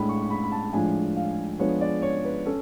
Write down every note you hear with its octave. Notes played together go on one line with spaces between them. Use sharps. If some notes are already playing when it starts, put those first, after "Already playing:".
Already playing: A2 G#3 D4 B5
C#6
C#6
B5
B5
A5
A2 F3 G#3 D4 G#5
F5
F3 G#3 B3 D4 C#5
D5
C#5
B4
C#4 A4